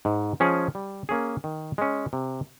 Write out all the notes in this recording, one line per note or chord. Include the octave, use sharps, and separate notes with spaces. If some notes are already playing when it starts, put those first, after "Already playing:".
G#2
F3 G#3 C#4 G#4
G3
A#3 C#4 G#4
D#3
G#3 C#4
C3